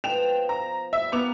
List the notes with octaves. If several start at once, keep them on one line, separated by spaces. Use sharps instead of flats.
B2 F3 G5 E7 F7
A#5
G3 E5
B3 G4 A#4 F5 D6 F7